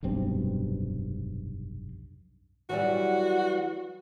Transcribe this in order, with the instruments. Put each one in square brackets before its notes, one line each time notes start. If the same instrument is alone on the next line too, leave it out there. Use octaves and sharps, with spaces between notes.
[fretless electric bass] F1 B1 G2 C4
[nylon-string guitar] E3 F#3 G3 [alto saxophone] F#4